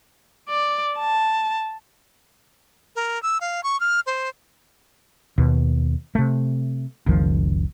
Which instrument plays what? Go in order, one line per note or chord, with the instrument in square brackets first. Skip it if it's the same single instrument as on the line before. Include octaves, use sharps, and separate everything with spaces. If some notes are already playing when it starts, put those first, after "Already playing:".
[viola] D5
A5
[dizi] A#4
E6
F5
C#6
F6
C5
[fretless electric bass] D#2 B2
C3 A3
F#1 C#2 D#3 F3